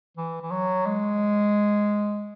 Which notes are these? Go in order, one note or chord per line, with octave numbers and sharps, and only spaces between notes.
E3
E3
F#3
G#3